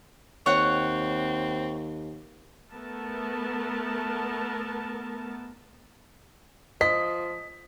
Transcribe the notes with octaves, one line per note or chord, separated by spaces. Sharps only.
D#2 C4 C#5 F#5
A3 B3 A#4 A5
F3 D#5 B6